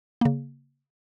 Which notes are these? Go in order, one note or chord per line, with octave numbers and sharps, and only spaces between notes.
C#3 A#3